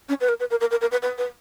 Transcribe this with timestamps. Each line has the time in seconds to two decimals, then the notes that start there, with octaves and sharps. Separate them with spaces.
0.09 C#4
0.21 B4
0.28 A#4
0.40 B4
0.50 A#4
0.61 A#4
0.71 A#4
0.81 A#4
0.91 B4
1.02 B4
1.18 B4